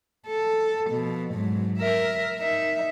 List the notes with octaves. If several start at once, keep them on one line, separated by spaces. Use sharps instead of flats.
A4
B2 F3
G#2 F#3
A#4 E5
D#4 E5